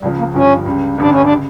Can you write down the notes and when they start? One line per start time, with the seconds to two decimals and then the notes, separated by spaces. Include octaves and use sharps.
0.02 C#2 C#3 F3 G3
0.19 A#3
0.34 G1 G2 F3 C#4
0.66 C#2 C#3 G3
0.98 A1 G2 D3 G3 D4
1.10 C#4
1.22 D4
1.30 C#3